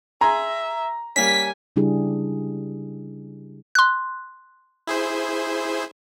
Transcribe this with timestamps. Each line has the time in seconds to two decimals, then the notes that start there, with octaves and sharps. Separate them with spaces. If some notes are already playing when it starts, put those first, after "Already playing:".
0.21 G#4 E5 G#5 A#5 C6
1.16 G3 A#3 C#4 G#5 B6
1.76 C#3 G3 D4 E4 G4 G#4
3.75 C6 F#6
4.87 E4 G#4 C5